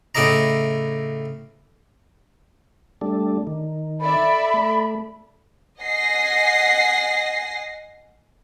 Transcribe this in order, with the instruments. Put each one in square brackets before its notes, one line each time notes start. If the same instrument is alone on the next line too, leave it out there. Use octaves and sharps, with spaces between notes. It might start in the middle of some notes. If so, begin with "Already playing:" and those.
[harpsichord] A2 C#3 E4 D5 D#5 A#5
[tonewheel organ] G3 A3 D4
D#3
[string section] A4 D5 E5 [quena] B5
[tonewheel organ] A3
[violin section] D#5 F#5 G#5 A#6 C7